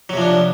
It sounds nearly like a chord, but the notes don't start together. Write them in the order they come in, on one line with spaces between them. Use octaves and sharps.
F#3 C3 F3 D4